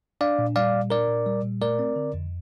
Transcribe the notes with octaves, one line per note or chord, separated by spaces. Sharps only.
D4 D5 F5
A#2
G3 D5 F5
A#2
D4 A#4 D5
A#2
G3
A#2
A3 A#4 D5
C4
D3
F2